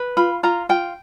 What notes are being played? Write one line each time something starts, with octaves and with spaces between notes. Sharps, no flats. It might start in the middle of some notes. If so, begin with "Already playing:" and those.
Already playing: B4
F4 B5
F4 A#5
F4 G5